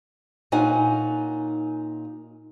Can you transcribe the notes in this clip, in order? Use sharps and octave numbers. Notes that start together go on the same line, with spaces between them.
A#2 C#4 D#4 F#5 G#5